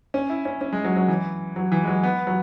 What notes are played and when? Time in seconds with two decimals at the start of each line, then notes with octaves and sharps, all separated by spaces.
0.14 C#4
0.30 E4
0.45 C#4
0.61 C#4
0.73 G#3
0.85 F#3
0.96 F#3
1.08 E3
1.56 F#3
1.72 E3
1.84 G#3
1.88 F#3
2.03 B3
2.27 F#3